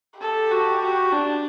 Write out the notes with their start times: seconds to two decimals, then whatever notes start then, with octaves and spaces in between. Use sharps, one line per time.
0.20 G4 A4
0.51 F#4
0.81 F#4
1.12 D4